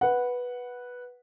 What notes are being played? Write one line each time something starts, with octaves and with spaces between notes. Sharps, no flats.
B4 F#5